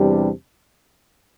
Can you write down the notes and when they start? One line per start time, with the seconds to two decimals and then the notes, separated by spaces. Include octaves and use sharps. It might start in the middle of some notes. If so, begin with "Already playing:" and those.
Already playing: E2 C3 G3 D4